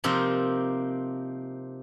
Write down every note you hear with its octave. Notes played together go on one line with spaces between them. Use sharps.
C3 F3 A#3 C4 D#4 G4